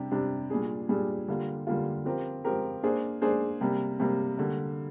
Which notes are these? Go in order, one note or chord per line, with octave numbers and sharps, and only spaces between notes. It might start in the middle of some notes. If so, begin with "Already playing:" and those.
Already playing: C3 G3 D4 G4
C3 G3 D4 G4
A#2 G3 D4 G#4
A#2 G3 D4 G#4
D3 G3 A#3 F4
D3 G3 A#3 F4
F3 C4 G4 A#4
F3 C4 G4 A#4
A#3 D4 G#4 C5
A#3 D4 G#4 C5
C3 G3 A#3
C3 G3 A#3
D3 G3 A#3